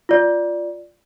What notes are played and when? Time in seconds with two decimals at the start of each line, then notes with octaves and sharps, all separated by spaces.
0.09 F4 D5